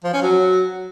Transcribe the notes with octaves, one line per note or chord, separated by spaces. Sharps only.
F3
C#4
F#3